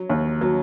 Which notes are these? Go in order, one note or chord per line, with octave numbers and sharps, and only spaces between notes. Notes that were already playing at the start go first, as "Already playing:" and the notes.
Already playing: F#3
D#2
F#3